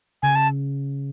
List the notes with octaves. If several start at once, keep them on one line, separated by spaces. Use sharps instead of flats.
C#3 G#5
A5